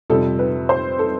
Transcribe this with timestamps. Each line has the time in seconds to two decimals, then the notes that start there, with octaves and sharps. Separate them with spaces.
0.10 F2 C3 G3 C4 A4
0.39 B4
0.69 C5
0.99 A4